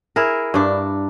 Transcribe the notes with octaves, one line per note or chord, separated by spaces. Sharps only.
E4 G#4 A#4
G2 D4